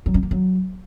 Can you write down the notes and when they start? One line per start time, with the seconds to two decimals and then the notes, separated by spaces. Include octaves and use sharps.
0.06 F#3
0.14 C#4
0.23 A#3
0.31 F#3